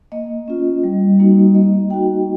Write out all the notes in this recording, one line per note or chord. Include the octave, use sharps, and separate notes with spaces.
A#3 D#5
C#4 F4
G3
A#3 D#4 F#4
A#3 D#5
D#4 F#4 G5